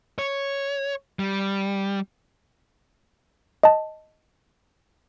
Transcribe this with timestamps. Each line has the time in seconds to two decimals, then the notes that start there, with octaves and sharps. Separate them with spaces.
0.19 C#5
1.19 G3
3.63 D#5 A5